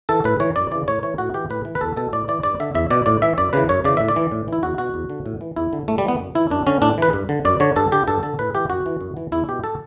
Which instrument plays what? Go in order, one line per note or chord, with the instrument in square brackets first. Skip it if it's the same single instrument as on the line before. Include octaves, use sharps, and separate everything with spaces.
[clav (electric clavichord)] E3 A4
A2 B4
E3 C#5
F#2 D5
C#3 E3 D5
A2 C#5
E3 C#5
A2 F#4
E3 G4
A2 B4
E3
B4
E2 A4
B2 A4
A2 D5
E3 D5
G2 D5
D3 E5
E2 E5
B2 D5
A2 D5
E3 E5
F#2 D5
C#3 E3 B4
F#2 C#5
C#3 E3 D5
A2 E5
D5
E3
A2
E3 E4
E2 F#4
B2 F#4
E2
D3
A2
E3
E2 E4
D3
A2 A3
G3
E3 B3
F#2
E3 E4
F#2 D4
D3 C#4
A2 D4
E3 B4
G2
D3
F#2 D5
D3 C#5
G2 A4
D3 G4
G2 A4
D3 A4
A2 B4
E3 G4
F#2 F#4
E3
F#2
E3
E2 E4
B2 G4
A4